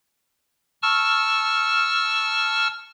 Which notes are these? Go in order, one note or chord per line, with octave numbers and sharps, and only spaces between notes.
A5 C#6 E6 F6